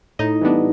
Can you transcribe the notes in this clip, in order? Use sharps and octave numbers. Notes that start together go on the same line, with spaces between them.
A2 D#4 D#5
E3 G3 B3 D4